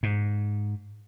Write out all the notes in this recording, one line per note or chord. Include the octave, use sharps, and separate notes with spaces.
G#2